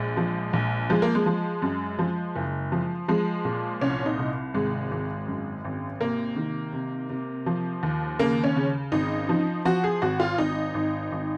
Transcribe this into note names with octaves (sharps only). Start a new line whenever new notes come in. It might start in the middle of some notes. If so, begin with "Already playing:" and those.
Already playing: A#1 G#3
F3
A#1
F3 G#3
A#3
G#3
F3
F#2
F3
F#1
F3
F3 G#3
A#2
C2 C#4
D#4
C2
G#1 G#3
G#1
F#2
G#1
C3 A#3
D#3
C3
C3
F3
D#2
C#3 A#3
C#4
C#3
G#1 D#4
F3
F3 F#4
G#4
G#1 F#4
F4
G#1 D#4
G#1
G#1